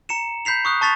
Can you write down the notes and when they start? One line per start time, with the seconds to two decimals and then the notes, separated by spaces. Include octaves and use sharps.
0.09 A#5 C#7 E7
0.45 B5 G6 B6 C7 F7
0.65 C#6 D#6 F#6
0.81 A5 C#6 A6 B6 F7